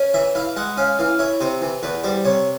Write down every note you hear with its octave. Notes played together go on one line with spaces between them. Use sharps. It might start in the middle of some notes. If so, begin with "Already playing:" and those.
Already playing: C#4
E3 E5
E4 F5
G#3 F#5
C#4 F5
E3 F5
E4 C#5
C3 C5
E3
E2 B4
G3 C5
C3 C#5